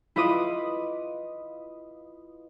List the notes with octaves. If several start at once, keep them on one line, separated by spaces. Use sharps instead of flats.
E4 F4 B4 D#5 D6 D#6